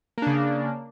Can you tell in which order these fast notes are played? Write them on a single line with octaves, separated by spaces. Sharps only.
A#3 D4 C#3